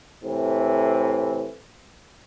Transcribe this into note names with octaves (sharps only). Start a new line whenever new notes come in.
A2 C3 E3